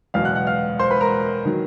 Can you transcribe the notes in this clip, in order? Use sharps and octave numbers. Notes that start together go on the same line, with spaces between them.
F#1 E2 B2 F5 F6
F#5 F#6
F#5 F#6
F5 F6
C5 C6
B4 B5
A#4 A#5
D#3 F#3